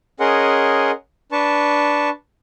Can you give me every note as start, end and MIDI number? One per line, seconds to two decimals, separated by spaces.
0.20 0.91 61
0.20 0.91 68
0.20 0.91 70
0.20 0.91 75
0.20 0.91 78
0.20 0.91 84
1.32 2.09 62
1.32 2.09 71
1.32 2.09 81
1.32 2.09 85